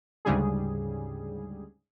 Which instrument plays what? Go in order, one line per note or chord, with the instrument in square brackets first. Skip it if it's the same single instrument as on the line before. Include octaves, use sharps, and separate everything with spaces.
[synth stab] D2 G#2 C#3 G3 G#4